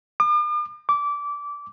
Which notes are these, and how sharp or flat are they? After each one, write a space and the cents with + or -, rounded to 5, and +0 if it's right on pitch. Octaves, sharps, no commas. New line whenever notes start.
D6 +45
D6 -20